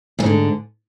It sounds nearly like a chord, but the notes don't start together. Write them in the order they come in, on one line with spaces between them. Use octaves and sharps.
E2 G#2 D3